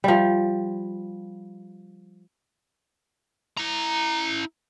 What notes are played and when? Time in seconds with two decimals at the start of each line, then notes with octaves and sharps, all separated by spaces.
0.04 F3 G3
3.58 E4 A#5